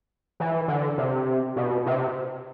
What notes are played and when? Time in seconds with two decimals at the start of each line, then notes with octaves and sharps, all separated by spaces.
0.40 E3
0.68 D3
0.98 C3
1.56 B2
1.86 C3